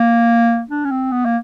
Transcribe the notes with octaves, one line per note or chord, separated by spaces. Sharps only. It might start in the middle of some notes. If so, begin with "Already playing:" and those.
Already playing: A#3
D4
C#4
C4
B3
A#3